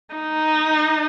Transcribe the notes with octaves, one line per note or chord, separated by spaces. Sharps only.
D#4